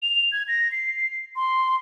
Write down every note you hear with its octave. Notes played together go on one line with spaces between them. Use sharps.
F7
G#6
A#6
C7
C6